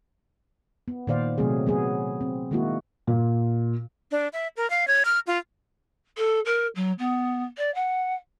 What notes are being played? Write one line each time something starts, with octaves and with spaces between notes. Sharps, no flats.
B3
A#2 D#3 C5 D5 F5
C3 F#3 A3 C4 G#4
F#3 B3 G#4
C4
D#3 G#3 A#3 E4 F#4
A#2
D4
E5
A#4
F5
C#5
F6
F4
A4
A#4
F#3
B3
D5
F#5